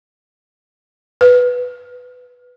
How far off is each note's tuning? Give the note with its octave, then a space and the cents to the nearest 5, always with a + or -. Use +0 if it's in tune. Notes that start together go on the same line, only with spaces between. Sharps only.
B4 +0